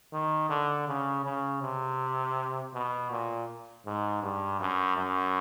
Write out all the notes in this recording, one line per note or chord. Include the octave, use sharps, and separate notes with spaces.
D#3
D3
C#3
C#3
C3
B2
A#2
G#2
G2
F#2
F#2